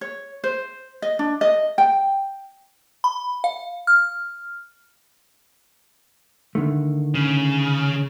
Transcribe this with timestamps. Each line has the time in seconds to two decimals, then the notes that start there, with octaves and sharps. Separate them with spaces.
0.01 C#5
0.44 C5
1.02 D#5
1.19 D4
1.41 D#5
1.78 G5
3.04 B5
3.44 F5
3.87 F6
6.55 D3 D#3 A3
7.15 C#3